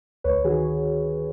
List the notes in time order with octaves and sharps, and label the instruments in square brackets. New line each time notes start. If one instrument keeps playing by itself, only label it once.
[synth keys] D2 B4 C#5
D#3 F#4 G#4